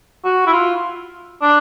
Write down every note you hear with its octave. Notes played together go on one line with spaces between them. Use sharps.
F#4
E4
F4
D4